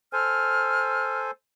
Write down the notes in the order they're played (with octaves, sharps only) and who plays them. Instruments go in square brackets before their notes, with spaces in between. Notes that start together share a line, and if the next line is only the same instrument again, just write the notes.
[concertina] A4 C5 G#5 [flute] F6